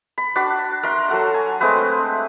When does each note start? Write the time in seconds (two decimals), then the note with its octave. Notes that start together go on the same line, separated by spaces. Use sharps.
0.18 B5
0.35 D4 F#4 A5 B5
0.83 A#4 E5 C6
1.09 F#3 A4 F#5
1.34 G#5
1.60 G#3 A3 C4 B4